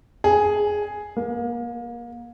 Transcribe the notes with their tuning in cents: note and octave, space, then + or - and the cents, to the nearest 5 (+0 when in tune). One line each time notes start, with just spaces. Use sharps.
G#4 +5
A#3 +30